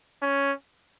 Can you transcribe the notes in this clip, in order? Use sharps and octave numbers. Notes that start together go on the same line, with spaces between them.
C#4